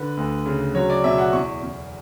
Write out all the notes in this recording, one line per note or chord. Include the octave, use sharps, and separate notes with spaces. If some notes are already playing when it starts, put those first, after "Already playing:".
Already playing: D3 B4
D2
C#3
F#3 C#5
D5
B2 E5
F#5
E2 C#6
E2